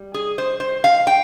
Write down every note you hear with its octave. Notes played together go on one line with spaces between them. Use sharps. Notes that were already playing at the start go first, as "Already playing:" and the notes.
Already playing: G3
G#4
C5
C5
F5
G5